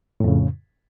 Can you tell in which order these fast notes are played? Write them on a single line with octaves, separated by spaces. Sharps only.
A2 F2 C#3